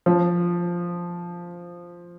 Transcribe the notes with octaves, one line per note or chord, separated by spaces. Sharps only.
F3